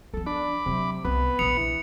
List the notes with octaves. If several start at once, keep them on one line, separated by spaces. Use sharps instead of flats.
F3 B3 A4
D4 B5 D6
C3 F#3 A3
C2 B3 C#4 B4
A#1 D#2 D#6 C#7 F7
E3